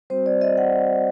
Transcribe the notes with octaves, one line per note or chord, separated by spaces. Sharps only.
G3 C4 F#4 C5
D5
D#5
F#5